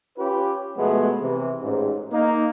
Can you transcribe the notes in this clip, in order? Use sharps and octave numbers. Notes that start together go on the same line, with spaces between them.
C#4 F4 G4 B4
B2 F3 G#3 A3 B3
C3 E3
A1 G#2
A#3 D#4